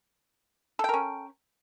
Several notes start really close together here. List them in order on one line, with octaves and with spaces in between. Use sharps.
A4 G5 A#4 C#4